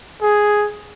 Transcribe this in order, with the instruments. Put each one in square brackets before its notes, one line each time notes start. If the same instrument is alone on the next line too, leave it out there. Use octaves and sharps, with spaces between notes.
[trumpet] G#4